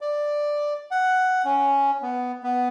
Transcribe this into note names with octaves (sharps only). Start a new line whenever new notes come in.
D5
F#5
C#4
B3
B3